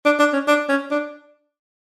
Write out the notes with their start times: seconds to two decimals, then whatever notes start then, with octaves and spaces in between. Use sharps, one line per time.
0.05 D4
0.19 D4
0.33 C#4
0.48 D4
0.69 C#4
0.91 D4